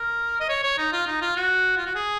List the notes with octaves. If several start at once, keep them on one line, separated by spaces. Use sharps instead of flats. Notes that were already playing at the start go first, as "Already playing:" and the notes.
Already playing: A#4
D#5
C#5
C#5
D#4
F4
D#4
F4
F#4
F4
F#4
G#4